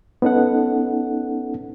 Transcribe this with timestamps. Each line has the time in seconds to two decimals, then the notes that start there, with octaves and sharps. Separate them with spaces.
0.22 B3 C#4 D#4 A4 F#5